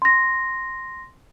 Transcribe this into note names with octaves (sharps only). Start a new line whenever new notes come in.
C6 A#6